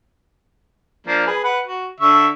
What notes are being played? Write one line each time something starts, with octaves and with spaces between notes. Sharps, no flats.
F3 A#3 D4
G#4 B4
B4 F#5
F#4
D3 E5 C#6